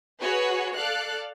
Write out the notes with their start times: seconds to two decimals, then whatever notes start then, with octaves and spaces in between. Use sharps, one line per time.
0.21 F#4 G#4 B4 C#5
0.76 A4 D5 F5 F#6